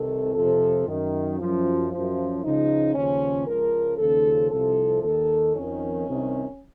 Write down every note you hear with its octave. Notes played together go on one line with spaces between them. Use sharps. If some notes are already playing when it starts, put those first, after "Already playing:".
Already playing: C2 C3 D#3 A4
F2 C3 F3 A4
F#2 D#3
F#2 F3
F#2 F3
C#2 C#3 F3 D#4
D#2 C#3 F3 C#4
C#2 C#3 F3 A#4
D#2 C#3 F3 A4
C2 C3 F3 A4
D#2 D#3 A4
F2 D#3 C#4
C2 C3 D#3